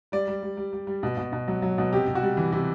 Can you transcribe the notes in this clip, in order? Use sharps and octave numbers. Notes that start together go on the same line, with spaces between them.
G3 D5
G3
G3
G3
G3
G3
B2
B2
B2
F#3
F#3
B2
C3 G4
C3
F#4
G3
E3
C3